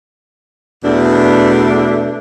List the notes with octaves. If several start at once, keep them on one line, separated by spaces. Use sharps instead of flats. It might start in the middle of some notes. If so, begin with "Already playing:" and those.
E2 B2 A3 D4